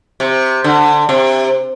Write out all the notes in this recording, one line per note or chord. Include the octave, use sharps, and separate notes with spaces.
C3
D3
C3